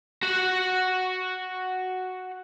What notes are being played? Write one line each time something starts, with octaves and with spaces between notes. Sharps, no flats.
F#4 F#5